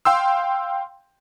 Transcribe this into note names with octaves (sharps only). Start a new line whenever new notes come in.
F5 G5 C6 E6